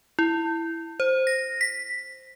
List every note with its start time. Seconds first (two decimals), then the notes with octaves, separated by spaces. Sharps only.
0.19 E4
1.00 C5
1.27 A#6
1.61 B6